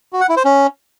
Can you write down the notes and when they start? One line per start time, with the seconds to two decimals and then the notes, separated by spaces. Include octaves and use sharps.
0.13 F#4
0.21 F#5
0.29 E4
0.37 C5
0.45 C#4